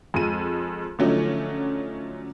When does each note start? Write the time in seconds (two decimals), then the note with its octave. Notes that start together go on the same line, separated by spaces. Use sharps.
0.14 F2 G#3 D#7
0.99 D3 F3 F#3 A3 C#4 D#4